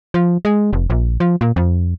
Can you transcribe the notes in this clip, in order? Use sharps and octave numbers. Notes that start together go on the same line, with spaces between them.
F3
G#3
F1
A#1
F3
A#2
F2